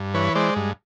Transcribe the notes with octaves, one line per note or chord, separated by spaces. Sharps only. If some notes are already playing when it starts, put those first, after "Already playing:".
Already playing: G2
E3 B4 C#5
G#3 C5 D5
G2